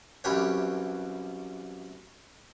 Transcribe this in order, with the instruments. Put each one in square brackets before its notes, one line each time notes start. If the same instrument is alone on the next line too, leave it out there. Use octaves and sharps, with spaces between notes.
[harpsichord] C2 F#2 E3 G4 B4 C#5